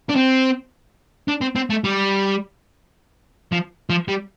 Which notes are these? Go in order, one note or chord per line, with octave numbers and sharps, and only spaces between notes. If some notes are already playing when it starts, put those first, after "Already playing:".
D4
C4
D4
C4
C4
A3
G3
F3
F3
G3